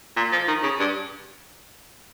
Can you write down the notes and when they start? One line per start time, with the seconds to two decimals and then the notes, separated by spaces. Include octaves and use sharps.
0.16 A#2
0.32 F3
0.48 D#3
0.63 C#3
0.80 G2